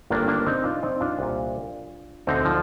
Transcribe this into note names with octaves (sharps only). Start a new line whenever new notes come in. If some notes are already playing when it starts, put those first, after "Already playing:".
G1 G2 D#3 A#3 D4
A#3 D4
C4 D#4
D4 F4
C4 D#4
D4 F4
C2 A#2
D2 D3 C4 D#4
F3